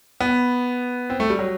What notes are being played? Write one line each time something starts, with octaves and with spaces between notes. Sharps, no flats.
B3
C4
A3
G3
F#3